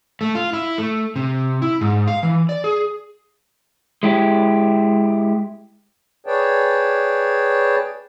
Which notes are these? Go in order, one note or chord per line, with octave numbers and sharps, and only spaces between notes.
A3
F4
E4
A3
C3
E4
G#2
F5
E3
D5
G#4
G#3 E4 G4
G#4 B4 C#5 D5 G5 A5